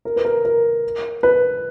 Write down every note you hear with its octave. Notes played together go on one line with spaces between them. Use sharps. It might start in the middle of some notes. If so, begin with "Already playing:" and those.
A#4
B4
A#4
A#4
B4